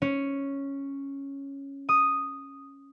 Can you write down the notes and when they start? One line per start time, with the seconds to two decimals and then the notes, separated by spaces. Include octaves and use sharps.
0.02 C#4
1.89 D#6